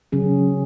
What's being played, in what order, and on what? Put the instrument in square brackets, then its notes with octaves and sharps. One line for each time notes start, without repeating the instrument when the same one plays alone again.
[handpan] C#3 F#3 C#4 G#4